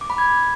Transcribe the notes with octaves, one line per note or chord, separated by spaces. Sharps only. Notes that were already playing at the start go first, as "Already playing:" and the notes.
D6
B5
G#6